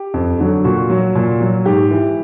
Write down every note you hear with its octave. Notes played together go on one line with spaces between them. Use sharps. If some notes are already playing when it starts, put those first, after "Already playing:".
Already playing: G4
F2
D3 F#3
A#2 F#4
F#3
A#2
F#3
G#2 G4
E3